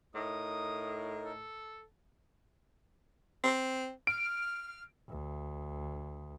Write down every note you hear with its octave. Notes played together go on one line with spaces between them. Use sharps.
A2 D#4 A#4 D#6
A4
C4
F6 D7
D2